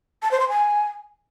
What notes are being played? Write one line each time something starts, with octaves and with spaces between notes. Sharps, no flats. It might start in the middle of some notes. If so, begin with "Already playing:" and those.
A5
C5
C6
G#5